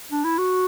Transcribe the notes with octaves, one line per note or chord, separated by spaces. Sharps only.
D4
E4
F#4